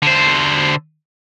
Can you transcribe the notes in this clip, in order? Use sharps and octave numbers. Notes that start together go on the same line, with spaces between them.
D3 C5